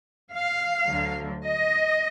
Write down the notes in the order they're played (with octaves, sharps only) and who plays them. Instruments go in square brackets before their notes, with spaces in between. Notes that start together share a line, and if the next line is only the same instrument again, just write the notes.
[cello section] F5
D2 D3 F#3
D#5